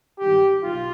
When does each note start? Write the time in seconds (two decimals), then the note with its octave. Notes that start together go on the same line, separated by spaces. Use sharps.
0.19 G#1 G2 D#3 G4
0.64 B1 F4